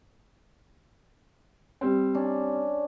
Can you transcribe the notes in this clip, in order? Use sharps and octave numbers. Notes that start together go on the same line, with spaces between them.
G3 C4
C#4 D4